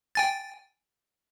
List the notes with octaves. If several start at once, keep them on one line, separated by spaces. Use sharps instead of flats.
G5 G#5 A6